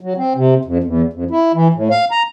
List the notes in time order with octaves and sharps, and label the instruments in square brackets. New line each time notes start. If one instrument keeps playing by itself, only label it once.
[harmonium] F#3
C4
C3
F2
E2
F2
E4
E3
A2
F5
A#5